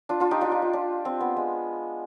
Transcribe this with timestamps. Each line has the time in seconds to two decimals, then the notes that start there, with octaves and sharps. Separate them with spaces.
0.09 D4 F4
0.20 D4 F4
0.31 D#4 G4
0.41 D4 F4
0.51 D#4
0.62 D4
0.73 D4
1.05 C4
1.21 B3
1.37 G#3